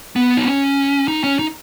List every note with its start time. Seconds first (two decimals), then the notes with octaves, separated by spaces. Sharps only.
0.16 B3
0.37 D#4
0.46 C#4
1.08 D#4
1.24 C#4
1.39 D#4